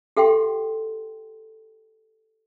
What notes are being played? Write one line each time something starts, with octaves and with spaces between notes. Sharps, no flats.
G4 A4 E5 F#5 G5 C6